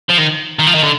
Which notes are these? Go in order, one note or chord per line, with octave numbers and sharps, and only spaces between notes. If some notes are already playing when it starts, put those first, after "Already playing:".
F3
D#3
D#3
F3
D#3
D3